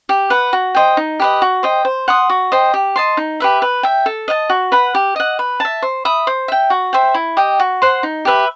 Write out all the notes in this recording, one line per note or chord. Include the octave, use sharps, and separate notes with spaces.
G4
B4 F#5
F#4
C5 D#5 G5
D#4
G4 B4 D#5
F#4
C5 D#5 G5
C5
F#5 C6 D#6
F#4
C5 D#5 G5
G4
D#5 A5 C6
D#4
G4 B4 E5
B4
E5 G5
A4
D#5 F#5 A5
F#4
B4 F#5 B5
G4
D#5 F#5
B4
E5 A5
C5
E5 B5 D#6
C5
E5 G5
F#4
C5 E5 G5
E4
G4 D#5 G5
F#4
C5 F#5 C6
D#4
G4 B4 E5